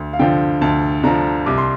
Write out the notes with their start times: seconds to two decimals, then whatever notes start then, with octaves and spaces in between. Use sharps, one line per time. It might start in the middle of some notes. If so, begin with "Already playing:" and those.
Already playing: D2
0.13 F5
0.19 D3 F3 G5
0.61 D2 A5
1.04 D3 F3 A#5
1.46 C2 D6
1.58 C6